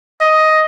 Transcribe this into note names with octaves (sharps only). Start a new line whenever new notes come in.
D#5